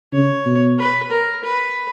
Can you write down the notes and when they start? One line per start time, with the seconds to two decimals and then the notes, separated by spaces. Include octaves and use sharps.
0.13 C#3 C#5
0.46 B2
0.79 B4
1.11 A#4
1.44 B4